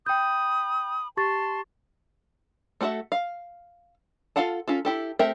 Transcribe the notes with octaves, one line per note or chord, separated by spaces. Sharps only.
G5 B5 D#6 G6
G4 A5 C6 C#6 A6
A3 D4 F#4 A4 E5
F5
F4 A4 F5 F#5 A5
C#4 F4 A4
E4 G4 A4
A3 C4 G4 A#4 E5